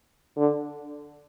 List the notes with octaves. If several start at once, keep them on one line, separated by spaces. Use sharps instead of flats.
D3